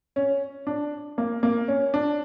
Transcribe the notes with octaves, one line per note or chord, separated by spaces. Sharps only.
C#4
D4
A#3
A#3
C#4
D4